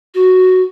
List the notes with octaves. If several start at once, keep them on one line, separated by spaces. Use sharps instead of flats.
F#4